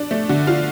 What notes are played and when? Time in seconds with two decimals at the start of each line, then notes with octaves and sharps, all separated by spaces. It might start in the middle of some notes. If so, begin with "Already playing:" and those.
Already playing: D4
0.11 A3
0.29 D3
0.47 F4